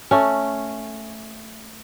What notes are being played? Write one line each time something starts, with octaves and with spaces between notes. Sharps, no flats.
A3 C#4